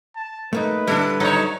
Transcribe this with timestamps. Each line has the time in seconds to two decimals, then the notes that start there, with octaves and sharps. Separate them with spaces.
0.16 A5
0.53 A3 A#3 D#4 B4
0.87 D3 G3 D4 E4 A4
1.20 F#3 D#4 A4 C#5 D#5